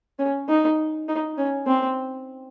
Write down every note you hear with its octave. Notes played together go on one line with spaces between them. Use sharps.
C#4
D#4
D#4
C#4
C4